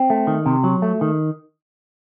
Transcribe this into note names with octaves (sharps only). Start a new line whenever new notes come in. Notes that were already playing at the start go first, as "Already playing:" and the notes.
Already playing: C4
A3
D#3
C3
F#3
A3
D#3